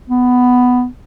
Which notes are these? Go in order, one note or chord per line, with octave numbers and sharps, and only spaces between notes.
B3